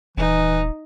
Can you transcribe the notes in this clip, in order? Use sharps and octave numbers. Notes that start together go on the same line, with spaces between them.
D#1 E3 D#4